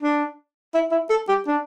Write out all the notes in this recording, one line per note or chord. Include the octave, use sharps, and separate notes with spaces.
D4
E4
E4
A4
G4
D4